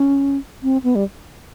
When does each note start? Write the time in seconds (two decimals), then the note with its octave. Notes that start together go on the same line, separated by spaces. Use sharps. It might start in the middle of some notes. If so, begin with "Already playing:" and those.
Already playing: C#4
0.63 C4
0.84 B3
0.95 G3